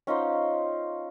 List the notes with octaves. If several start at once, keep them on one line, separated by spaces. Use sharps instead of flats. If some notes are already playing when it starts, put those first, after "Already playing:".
C#4 D#4 F4 C5